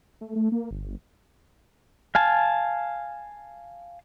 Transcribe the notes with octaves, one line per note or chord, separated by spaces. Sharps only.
A3
A3
A#3
G1
F5 G#5 A5